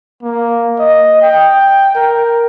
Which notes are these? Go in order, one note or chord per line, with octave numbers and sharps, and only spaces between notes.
A#3
D#5
G5
A#4